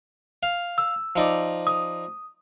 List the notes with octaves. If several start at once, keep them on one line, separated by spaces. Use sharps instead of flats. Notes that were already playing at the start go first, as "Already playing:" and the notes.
F5
E6
F3 D#4 D5
D#6